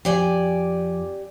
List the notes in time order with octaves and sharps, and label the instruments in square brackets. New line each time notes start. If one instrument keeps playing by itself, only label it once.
[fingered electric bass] F2 [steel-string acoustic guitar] G4 D5 G#5